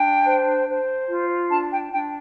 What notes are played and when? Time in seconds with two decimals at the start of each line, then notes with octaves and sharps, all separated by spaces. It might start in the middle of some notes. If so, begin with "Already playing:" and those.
Already playing: D4 G5
0.26 C5
0.68 C5
1.09 F4
1.51 D4 A5
1.71 G5
1.92 D4 G5